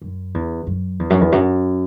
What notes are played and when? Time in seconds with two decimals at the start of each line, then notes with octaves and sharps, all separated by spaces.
0.02 F#2
0.34 E2
0.67 F#2
0.99 E2
1.10 F#2
1.21 E2
1.32 F#2